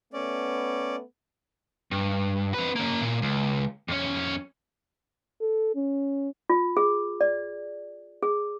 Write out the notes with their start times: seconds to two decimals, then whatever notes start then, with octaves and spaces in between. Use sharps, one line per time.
0.13 A3 B3 C#4 D5
1.91 G2
2.54 C4 B4
2.76 A#3 C#4
3.02 A#2
3.22 C#2
3.88 F2 C#4
5.41 A4
5.75 C#4
6.50 F4
6.77 G#4
7.21 D5
8.23 G#4